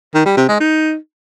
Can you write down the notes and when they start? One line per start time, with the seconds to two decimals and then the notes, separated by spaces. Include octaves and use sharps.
0.14 D#3
0.26 G3
0.37 C3
0.49 G#3
0.60 D#4